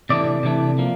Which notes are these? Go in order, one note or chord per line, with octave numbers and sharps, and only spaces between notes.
C3 E3 A3 D4 D5
C3 E3 A3 D4
F3 A#3